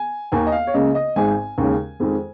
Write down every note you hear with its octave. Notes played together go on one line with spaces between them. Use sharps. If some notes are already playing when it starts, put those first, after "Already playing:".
Already playing: G#5
D#2 D#3 A#3 G#5
D#5
F5
C#5
C#2 C#3 A#3 D#5
D#5
G#1 G#2 G#3 G#5
D#2 C#3 G#3 C#4
F2 D#3 G#3